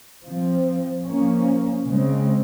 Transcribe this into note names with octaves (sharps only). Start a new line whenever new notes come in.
F3 C4
F3 A#3 C#4
C#3 G#3 C4